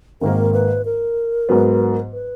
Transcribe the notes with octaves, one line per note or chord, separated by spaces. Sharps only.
G#1 G#2 D#3 A#3 A#4
B4
A#4
G#2 F#3 B3
B4